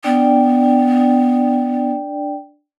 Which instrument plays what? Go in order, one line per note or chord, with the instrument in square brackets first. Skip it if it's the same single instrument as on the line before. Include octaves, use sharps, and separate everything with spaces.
[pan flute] B3 [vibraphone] D4 D5 G5